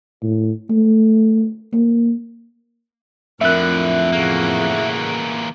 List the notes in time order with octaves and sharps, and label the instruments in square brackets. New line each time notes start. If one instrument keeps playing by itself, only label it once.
[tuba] A2
A3
A#3
[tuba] F2 [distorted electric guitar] A2 D3 [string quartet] A#4 [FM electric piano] E5 F#6
[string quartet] A2 C#3 F#4 [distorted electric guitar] E3 A#3